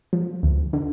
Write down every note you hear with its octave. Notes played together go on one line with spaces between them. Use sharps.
F3
D2
D3